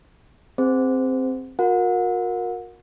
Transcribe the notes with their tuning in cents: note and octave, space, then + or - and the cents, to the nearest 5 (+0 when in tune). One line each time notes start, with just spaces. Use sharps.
C4 +5 G#4 -20 C5 -25
F#4 -40 A#4 +0 F#5 -35